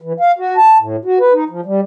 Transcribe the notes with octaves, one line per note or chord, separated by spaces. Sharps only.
E3
F5
F#4
A5
A2
F#4
B4
D#4
F3
G3